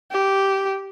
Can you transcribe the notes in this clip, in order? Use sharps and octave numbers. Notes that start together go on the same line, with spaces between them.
G4